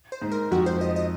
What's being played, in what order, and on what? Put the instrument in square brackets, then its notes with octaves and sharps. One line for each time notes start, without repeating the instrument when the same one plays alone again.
[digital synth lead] C5
[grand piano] G#2
[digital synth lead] A#4
[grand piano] F2 [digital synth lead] F#4
[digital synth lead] C5
D#5
D#5